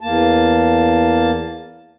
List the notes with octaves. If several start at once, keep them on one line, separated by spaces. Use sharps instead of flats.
E2 A#3 A5